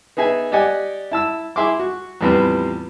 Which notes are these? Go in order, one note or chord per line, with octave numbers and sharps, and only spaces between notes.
B3 D#4 G#4 E5 G#5
G4 D5 D#5 F#5 G#5
E4 A5 E6
E4 G#4 E5 C6 D6
F#4
E2 A2 F3 G3 B3 C4